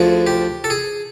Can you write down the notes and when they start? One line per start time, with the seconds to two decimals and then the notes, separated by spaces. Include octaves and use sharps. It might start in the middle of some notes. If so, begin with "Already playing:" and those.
Already playing: D2 D3 F3 G#4
0.27 G4
0.64 A4
0.70 G#4